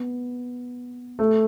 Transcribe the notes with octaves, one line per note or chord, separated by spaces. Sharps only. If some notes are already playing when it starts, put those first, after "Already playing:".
Already playing: B3
A3